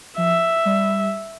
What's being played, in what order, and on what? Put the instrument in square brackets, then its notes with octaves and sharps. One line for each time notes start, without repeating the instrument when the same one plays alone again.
[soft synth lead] F3 [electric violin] E5
[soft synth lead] G3